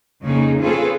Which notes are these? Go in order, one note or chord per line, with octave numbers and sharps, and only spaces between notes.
F2 C#3 A#3 D#4 G#4
C4 C#4 F4 G#4 A4 B4